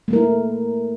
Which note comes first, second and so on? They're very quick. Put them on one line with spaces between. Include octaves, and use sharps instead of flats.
A3 A#3 A#4 E4